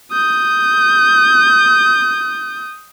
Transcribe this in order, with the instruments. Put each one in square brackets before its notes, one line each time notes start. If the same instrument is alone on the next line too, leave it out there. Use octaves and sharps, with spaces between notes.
[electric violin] D#6 G6